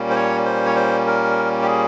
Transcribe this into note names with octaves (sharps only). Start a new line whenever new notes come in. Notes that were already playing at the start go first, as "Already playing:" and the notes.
Already playing: A#2 G3 A#3 C#4
C5
C#5
C5
C#5
C5
A#4
G4
G#4